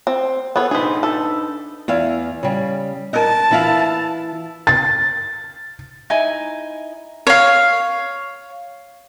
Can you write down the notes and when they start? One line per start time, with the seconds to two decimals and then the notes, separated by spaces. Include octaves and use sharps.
0.07 C4
0.56 B3 G#4 A4 C#5 D5
0.71 D4 D#4 G#4 B4 C5
1.03 A4
1.88 E2 E4 F5
2.43 C#3 G3
3.13 A#4 D#5 A5
3.51 E3 E4 F5
4.67 A6
6.10 D#4 E4 G#5
7.27 C#5 F5